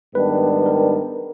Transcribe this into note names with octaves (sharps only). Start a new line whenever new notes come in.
G#2 D#3 G3 B3 D4 B4
A#4